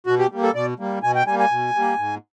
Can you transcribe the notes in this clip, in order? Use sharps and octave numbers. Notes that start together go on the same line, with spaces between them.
B2 F#4
G4
G3 A#3
A4
B2 D5
G3 A#3
B2 G#5
G5
G3 A#3 G#5
G#5
B2
G3 A#3
G#2